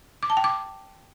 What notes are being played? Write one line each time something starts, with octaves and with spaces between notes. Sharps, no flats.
D6
A5
G5
D6